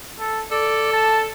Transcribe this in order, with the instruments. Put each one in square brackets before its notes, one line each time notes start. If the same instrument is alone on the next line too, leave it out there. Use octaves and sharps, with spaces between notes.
[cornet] A4
[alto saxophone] A4 [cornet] D5
[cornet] A5